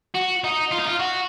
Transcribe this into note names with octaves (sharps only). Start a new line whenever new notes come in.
F#4
D#4
F4
D#4
F4
F#4